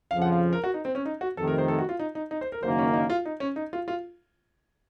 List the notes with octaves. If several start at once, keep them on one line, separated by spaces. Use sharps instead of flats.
F2 C#3 F3 F5
F#5
F5
A#4
F#4
D#4
C4
C#4
D#4
F#4
F2 C3 D#3 A3 A4
A#4
C5
A4
F#4
F4
D#4
D#4
D#4
C5
A#4
F#1 F#2 D#3 A#3 C5
C#4
D#4
F4
D#4
C#4
D#4
F4
F4